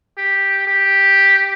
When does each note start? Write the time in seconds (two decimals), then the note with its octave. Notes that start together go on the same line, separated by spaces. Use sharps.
0.18 G4
0.67 G4